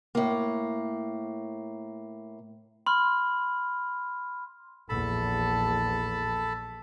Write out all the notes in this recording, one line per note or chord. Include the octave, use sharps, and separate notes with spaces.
A2 A#3
B5 C6 F6
A#1 E2 A4 A5 B5